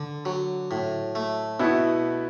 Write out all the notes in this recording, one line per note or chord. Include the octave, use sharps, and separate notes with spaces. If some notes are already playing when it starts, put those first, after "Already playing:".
Already playing: D3
F#3
A2
A3
B2 B3 E4